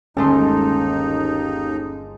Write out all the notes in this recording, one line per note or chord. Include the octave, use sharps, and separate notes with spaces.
G1 D#2 G#3 A3 C#4 D#4 A4 C6